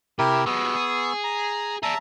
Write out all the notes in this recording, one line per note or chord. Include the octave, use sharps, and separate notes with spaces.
C3 E4 G4 A#4
F#3 G#3 B3 C#6 E6
G#4
A#5
G#4 D5 E5 A5 A#5